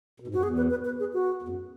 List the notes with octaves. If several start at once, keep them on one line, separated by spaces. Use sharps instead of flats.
B2
G#2
F#2 F#4
E2 G#4
B4
B4
B4
G#4
F#4
E2
F#2